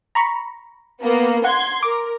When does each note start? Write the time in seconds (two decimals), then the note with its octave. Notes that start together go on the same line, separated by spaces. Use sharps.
0.15 A#5 B5 C#6
1.01 A#3 B3
1.44 F#5 C6 G#6
1.83 A#4 D6